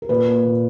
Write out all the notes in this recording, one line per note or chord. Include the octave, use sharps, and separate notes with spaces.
A#4
A#2 B4
A#3
A#2